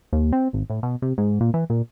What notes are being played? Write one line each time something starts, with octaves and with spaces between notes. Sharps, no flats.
D#2
C4
G#1
A2
B2
C3
G#2
A#2
E3
A#2